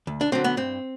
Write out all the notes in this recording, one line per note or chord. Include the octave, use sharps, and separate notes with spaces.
D2
D4
D3 F#3 C4
B3
G2 C4